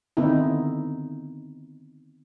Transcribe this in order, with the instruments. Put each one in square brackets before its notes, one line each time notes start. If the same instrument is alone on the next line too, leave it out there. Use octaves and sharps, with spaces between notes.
[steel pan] D3 D#3 B3 C4 D#4 E4